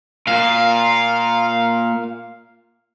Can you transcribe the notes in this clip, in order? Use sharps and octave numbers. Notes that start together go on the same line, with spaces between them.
A#2 F5